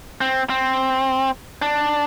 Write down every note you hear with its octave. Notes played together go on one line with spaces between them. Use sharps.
C4
C4
D4